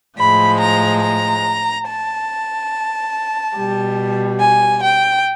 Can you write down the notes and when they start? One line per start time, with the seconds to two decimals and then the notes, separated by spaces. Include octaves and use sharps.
0.19 A2 F3 G#3 B5
0.61 A#5
1.03 A#5
1.88 A5
3.57 B2 G3
4.40 G#5
4.83 G5